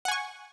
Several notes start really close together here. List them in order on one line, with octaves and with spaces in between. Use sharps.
F#5 G#5 C#6